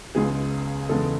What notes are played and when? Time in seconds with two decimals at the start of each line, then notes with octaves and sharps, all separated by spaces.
0.15 C#2 C#3 G#3 B3 G#4
0.89 E2 C#3 G#3 B3 A4